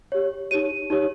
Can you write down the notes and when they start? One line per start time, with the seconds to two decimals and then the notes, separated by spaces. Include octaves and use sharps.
0.12 G4 C#5
0.51 D#4 G4 C#5 D#7
0.90 D#4 G4 C#5